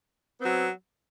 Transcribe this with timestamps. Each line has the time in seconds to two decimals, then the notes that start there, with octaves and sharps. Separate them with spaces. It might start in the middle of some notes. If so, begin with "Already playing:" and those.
0.39 B3
0.42 C4
0.45 F#3